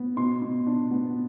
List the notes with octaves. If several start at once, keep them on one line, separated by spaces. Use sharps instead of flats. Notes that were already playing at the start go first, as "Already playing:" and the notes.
Already playing: B3
B2 C6
B2
D4
B3